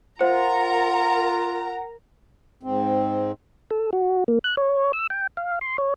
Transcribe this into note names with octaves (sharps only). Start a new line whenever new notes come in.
F4 A#4 C5 F#5 A#5
G#2 C4
A4
F#4
A#3
F#6
C#5
E6
G5
F5
C6
C#5